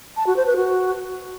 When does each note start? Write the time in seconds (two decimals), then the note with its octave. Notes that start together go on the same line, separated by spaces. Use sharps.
0.17 A5
0.27 F#4
0.37 C5
0.46 B4
0.56 F#4